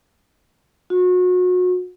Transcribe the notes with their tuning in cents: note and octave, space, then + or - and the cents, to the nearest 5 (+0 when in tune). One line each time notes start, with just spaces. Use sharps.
F#4 -30